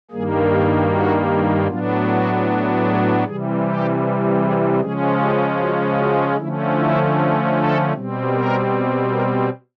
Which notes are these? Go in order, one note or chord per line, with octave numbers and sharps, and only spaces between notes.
G2 D#3 G3 A#3 G#4
G4
F#4
A2 F#3 B3 D4 F4
F#4
G#4
C3 E3 G3 G#4
G4
G#4
C#3 F3 G#3 C#4 G#4
G4
F#4
F#4
D3 F3 A3 C#4 E4
E4
A4
B2 G3 C4
A#4
A#4